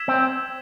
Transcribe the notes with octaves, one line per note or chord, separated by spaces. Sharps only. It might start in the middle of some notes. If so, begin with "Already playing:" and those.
Already playing: E6 G#6 B6 E7
C4